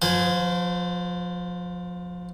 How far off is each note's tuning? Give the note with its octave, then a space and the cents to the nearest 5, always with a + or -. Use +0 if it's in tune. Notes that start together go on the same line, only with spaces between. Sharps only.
F3 +30 C5 -35 G#5 +0